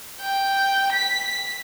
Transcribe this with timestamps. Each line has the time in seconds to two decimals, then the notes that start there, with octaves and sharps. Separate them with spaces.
0.21 G5
0.92 B6